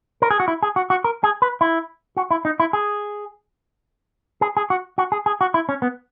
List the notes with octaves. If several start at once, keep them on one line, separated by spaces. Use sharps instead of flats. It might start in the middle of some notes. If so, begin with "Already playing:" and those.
A#4
G#4
F#4
E4
G#4
F#4
F#4
A#4
G#4
B4
E4
F#4
E4
D#4
E4
G#4
G#4
G#4
F#4
F#4
G#4
G#4
F#4
E4
C#4
B3